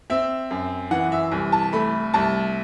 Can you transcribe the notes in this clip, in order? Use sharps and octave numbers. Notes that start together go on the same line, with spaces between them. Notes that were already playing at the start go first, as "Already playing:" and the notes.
C4 E5
F#2
E3 F#5
E5
C2
A5
A3 B5
C2 A5